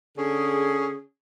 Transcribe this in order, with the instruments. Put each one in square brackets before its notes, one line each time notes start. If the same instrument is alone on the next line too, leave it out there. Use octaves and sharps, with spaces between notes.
[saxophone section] D3 C#4 G#4